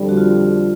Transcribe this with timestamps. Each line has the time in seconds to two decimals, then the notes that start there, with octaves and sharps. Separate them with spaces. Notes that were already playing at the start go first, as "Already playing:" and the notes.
Already playing: F2 D3 G3
0.09 F#4
0.17 F4